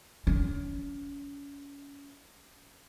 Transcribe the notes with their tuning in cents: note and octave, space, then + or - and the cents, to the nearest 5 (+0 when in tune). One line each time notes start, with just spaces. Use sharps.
C#4 +30